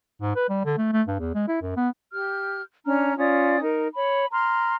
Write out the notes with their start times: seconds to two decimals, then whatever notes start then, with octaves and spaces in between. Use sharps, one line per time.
0.22 G#2
0.36 B4
0.49 G3
0.65 D3
0.78 A3
0.93 A3
1.08 G2
1.19 E2
1.35 G#3
1.48 E4
1.62 F#2
1.77 B3
2.12 G4 F6 G6
2.86 C#4 D4 A#5 F6
3.18 C#4 F4 D5 D#6
3.61 D#4 A#4
3.95 C#5 B5
4.32 A#5 C6 F6